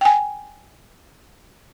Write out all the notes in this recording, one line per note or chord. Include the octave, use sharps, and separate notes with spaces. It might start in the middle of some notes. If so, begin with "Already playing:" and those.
G5 G#5